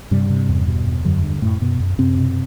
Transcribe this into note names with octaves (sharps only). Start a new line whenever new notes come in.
G2 C3 G3
C3
E2
B2
E2
F#2 D3 F#3
G2
F#2 A2 A3
F#2 B2 B3
F#2
F#2 C3 C4
B2